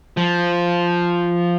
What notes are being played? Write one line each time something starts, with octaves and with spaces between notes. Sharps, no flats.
F3